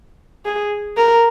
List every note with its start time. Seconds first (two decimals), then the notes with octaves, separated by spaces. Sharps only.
0.45 G#4
0.97 A#4